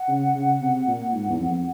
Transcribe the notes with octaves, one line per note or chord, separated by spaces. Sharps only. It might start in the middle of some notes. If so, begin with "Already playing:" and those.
Already playing: F#5
C#3
C#3
C3
A#2
G#2
E2
F2